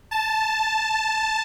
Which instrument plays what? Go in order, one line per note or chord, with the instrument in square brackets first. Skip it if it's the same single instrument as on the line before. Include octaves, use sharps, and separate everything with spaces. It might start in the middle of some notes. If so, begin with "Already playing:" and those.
[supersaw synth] A5